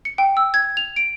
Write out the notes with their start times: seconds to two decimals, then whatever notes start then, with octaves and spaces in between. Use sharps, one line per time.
0.05 C#7
0.18 G5
0.37 E6
0.54 G#6
0.77 F7
0.96 D7